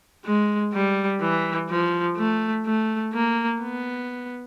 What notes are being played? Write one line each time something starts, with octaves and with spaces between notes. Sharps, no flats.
G#3
G3
E3
F3
A3
A3
A#3
B3